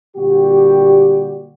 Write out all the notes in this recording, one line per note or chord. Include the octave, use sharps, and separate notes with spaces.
A#2 D3 G3 F#4 G4